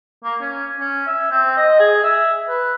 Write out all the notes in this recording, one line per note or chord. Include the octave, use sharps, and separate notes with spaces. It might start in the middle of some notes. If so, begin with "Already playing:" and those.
A#3
C#4
C#4
E5
C4
D#5
G#4
E5
B4